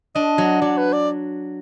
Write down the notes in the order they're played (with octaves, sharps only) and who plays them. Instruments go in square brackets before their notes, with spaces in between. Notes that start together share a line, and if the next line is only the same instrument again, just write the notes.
[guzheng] D4 [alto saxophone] D#5
[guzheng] F#3
[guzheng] F#3 [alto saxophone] D5
[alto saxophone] B4
D5